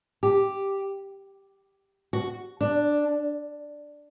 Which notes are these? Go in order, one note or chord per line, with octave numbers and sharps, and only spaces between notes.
G4
F#4
D4